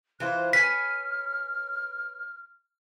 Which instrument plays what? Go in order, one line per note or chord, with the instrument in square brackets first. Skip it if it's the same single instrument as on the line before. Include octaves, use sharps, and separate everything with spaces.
[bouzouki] E3 F4 C5 [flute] F#6
[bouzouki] B4 C#5 G#5 [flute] F6 [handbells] B6